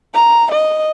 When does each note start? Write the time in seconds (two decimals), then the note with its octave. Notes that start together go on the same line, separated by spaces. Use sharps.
0.14 A#5
0.52 D#5